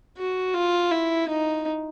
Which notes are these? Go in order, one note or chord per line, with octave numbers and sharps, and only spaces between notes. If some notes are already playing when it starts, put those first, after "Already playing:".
F#4
F4
E4
D#4